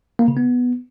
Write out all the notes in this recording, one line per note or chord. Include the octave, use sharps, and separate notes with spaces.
A#3
C#3
B3